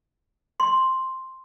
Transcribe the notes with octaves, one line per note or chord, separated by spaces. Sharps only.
C6